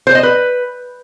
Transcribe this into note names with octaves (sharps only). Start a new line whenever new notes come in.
C5
D#5
B4